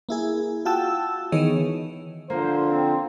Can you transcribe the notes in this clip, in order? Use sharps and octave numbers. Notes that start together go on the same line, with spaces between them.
A#3 E4 G#4
F4 F#4 G5 A5 E6
D#3 E3 B3 G#4 C#5 D#5
D3 F3 A#3 C5
C4